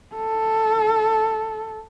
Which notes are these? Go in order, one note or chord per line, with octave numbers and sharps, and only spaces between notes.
A4